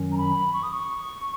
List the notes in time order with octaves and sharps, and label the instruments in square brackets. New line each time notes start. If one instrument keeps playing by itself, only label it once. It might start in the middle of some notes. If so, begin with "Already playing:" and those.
Already playing: [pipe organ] F#2 D#3 F#3 C#4
[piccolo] A#5
B5
C#6
D#6
C#6